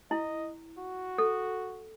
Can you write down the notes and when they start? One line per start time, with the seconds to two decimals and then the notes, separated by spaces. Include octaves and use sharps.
0.11 E4 D#5
0.78 F#4
1.18 A4